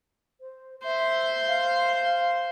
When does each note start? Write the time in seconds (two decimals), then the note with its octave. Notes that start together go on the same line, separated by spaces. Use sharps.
0.41 C5
0.84 C5 E5 C6
1.48 F5